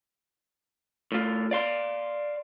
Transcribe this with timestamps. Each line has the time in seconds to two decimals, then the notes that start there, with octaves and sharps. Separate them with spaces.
1.12 A2 F4
1.51 D5 F5 C6